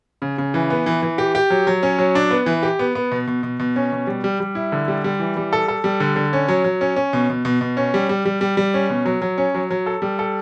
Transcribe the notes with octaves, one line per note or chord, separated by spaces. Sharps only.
C#3
C#3
E3
B3
E3
E3
G4
G4
F#3
F#3
C#4
F#3
D4
B3
E3
G4
B3
B3
B2
B2
B2
B2
C#4
B2
G3
G3
G3
E4
D3
G3
G3
E3
G3
A4
A4
G3
D3
D3
C#4
F#3
F#3
C#4
C#4
B2
B2
B2
B2
C#4
G3
G3
G3
G3
G3
C#4
B2
F#3
F#3
C#4
F#3
F#3
A4
G3
A4